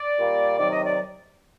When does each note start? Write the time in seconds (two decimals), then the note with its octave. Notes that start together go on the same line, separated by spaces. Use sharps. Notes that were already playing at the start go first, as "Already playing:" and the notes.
Already playing: D5
0.19 A#2 G3 A#3
0.58 C3 D#3 F#3 D5
0.72 D#5
0.85 D5